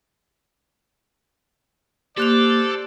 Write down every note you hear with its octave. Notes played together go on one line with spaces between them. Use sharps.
A#3 G4 A4 C5 D5 F#6 F7